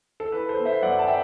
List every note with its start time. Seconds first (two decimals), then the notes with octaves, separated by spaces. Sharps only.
0.20 A4
0.32 E3 B4
0.49 A4 C5
0.57 B3
0.65 C5 E5
0.83 F#2 D5 F#5
0.99 A5
1.08 E5 G5